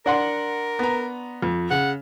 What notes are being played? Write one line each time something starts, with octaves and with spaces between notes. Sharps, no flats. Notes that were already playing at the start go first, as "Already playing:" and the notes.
D4 A#4 F#5 C6
B3 A#5
F2
C#3 F#5